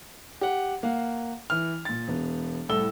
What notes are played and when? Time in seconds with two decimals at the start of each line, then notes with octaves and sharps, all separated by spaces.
0.41 G4 F#5
0.83 A#3 F5 F#5
1.50 E3 F6
1.85 A#2 A6
2.08 E1 B3
2.69 C2 A2 A4 E6 G7